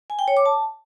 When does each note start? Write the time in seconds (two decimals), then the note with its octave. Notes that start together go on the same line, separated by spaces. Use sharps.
0.10 G#5
0.19 G5
0.28 C#5
0.37 D6
0.46 A5